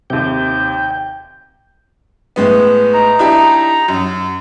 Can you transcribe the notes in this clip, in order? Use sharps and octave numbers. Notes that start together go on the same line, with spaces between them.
D#2 C3 G5
A2 G#3 B3
D#4 A#5
D4 E4 G4
F#2